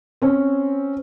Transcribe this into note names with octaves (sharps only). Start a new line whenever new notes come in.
C4 C#4